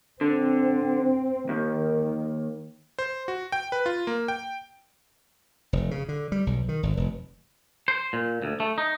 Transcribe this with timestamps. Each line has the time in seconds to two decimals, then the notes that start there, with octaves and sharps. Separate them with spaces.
0.21 D3 C4
1.49 D#2 D#3
2.99 C5
3.28 F#4
3.52 G5
3.72 B4
3.86 F4
4.07 A#3
4.28 G5
5.73 F1
5.91 C#3
6.09 D3
6.32 G3
6.47 B1
6.69 D#3
6.83 G#1
6.97 F1
7.88 C5
8.13 A#2
8.42 D2
8.60 A3
8.78 D#4